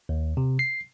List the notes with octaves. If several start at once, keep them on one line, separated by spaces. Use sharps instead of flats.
D#2
C3
C7